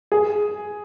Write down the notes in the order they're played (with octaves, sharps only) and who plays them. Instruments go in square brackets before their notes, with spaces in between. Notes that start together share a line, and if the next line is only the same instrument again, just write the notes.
[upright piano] G#4